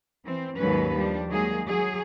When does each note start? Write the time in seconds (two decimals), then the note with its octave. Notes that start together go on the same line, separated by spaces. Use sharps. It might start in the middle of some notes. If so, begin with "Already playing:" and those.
0.23 E3 C4
0.56 D#2 G#2 F#3 C#4 B4
0.94 F3 G3 D4
1.28 D#3 F#3 G#3 A#3 G#4
1.65 F#3 G#4